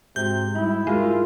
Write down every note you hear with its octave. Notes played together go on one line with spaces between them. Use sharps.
G#2 C3 G#3 F#4 G6
G3 D#4 E4
G#3 F4 F#4 G#4 A#4